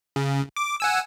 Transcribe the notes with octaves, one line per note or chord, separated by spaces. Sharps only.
C#3
D6
F#5 G#5 E6